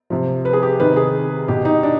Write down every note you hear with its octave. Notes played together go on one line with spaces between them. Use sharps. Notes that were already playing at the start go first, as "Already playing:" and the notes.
C3 F3
B4
G#4
G4
C3 D#3 B4
G#4
B2 G4
D#4
D4